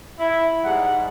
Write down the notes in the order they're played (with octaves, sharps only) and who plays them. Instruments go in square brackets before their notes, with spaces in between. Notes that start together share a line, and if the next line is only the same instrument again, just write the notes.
[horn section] E4
G#2 G3 F#5